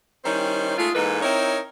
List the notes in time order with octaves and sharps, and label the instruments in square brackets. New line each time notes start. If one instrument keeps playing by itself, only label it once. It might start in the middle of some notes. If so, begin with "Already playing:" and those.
[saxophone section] D#3 G3 C#4 D#4 E4 C5
G#3 A3 D#4 F4
G#2 E3 A#3 D#4 A4 B4
C4 D#4 E4 A#4 C#5